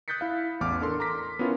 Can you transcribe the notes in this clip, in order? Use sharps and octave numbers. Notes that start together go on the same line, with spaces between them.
D#6 F#6 G6 A6 B6 C#7
E4 F5
A1 E2 D6 F6
D4 A4 A#4 C6
A#5 C6 D6 A#6 B6
B3 C#4 E4 F4 A#4 B4